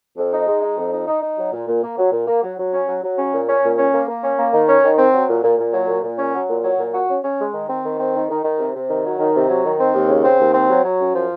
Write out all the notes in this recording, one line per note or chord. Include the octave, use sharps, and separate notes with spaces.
F2
D#4
G#3
D#4
F2
D#4
D#4
D#4
F#3
A#2
A#2
A#3
F#3
A#2
A#3
F#3
F#3
C#4
F#3
F#3
C#4
A#2
C#4
A#2
C#4
A#3
A#3
C#4
A#3
D#3
C#4
D#3
C4
F#3
A#2
A#2
A#2
F#3
A#2
A#2
C#4
F#3
A#2
F#3
A#2
F#4
C#4
C#4
G#3
D#3
C4
D#3
C4
D#3
D#3
D#3
C3
C3
D#3
F#3
D#3
C3
F#3
D#3
C4
D#2
C#3
C4
D#2
C4
F#3
F#3
F#2
F3